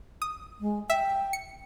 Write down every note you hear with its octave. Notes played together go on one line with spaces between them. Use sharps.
D#6
G#3
E5 G5
C#7